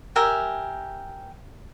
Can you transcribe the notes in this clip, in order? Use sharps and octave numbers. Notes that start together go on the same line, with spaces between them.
G4 A#4 E5 G#5